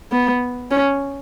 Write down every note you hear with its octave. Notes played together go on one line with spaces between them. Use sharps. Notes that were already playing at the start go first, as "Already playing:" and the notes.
B3
C#4